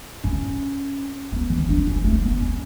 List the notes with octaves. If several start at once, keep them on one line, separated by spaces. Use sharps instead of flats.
C#4
B3
E3
D4
C#4
A3
B3
C#4